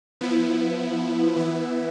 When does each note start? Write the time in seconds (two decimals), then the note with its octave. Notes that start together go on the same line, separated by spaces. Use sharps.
0.21 F3 B3 E4
1.36 E3 B3 E4